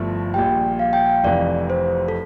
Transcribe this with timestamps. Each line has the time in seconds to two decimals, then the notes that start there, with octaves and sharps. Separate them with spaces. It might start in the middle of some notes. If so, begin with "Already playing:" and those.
Already playing: G1 G2 F3 A3 E4
0.34 A#1 A#2 G3 G5
0.79 F5
0.93 G5
1.06 F5
1.24 F1 F2 E3 D5
1.70 C5
2.08 A4